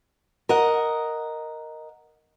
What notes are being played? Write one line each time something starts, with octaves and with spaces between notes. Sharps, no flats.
A#4 D#5 F#5